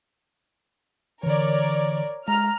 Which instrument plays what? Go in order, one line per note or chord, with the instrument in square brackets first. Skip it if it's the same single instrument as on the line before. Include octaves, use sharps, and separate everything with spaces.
[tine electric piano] D3 E3 [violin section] A#4 C#5 D5
[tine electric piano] G#3 [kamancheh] A#5 [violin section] F6